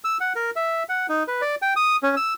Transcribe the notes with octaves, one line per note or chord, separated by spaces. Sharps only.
E6
F#5
A#4
E5
F#5
D#4
B4
D5
G5
D#6
C#4
E6